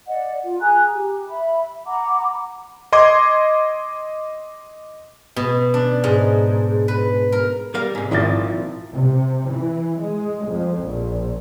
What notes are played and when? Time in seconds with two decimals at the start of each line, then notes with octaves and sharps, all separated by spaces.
0.08 D5 D#5 F#5
0.44 F4
0.60 G#4 G#5 A#5 F#6
0.92 G4
1.28 E5 B5
1.87 F#5 A#5 B5 D6
2.92 D#5 C6 D6 G#6
5.36 B2
5.74 D4
6.04 G#2
6.88 B4
7.32 A#4
7.74 G3 A#4 F5
7.95 G#2 C3
8.11 G#1 A#2 F3 A#3 E4 A6
8.93 C3
9.50 E3
10.01 G#3
10.49 F2
10.83 A#1